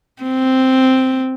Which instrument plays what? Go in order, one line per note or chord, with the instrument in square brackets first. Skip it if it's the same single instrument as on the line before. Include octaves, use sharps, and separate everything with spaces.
[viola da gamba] C4